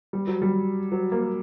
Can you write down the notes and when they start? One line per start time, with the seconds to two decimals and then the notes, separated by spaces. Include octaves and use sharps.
0.13 G3
0.27 F#3
0.42 G3
0.92 F#3
1.12 A#3